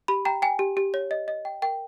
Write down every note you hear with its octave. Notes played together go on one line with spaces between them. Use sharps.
G4 B5
G5 A#5
G5 G#5
G4
G4
C#5
D#5
D#5
G5
A#4 G5